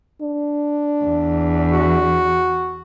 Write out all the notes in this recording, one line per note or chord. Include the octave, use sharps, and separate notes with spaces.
D4
E2
F#4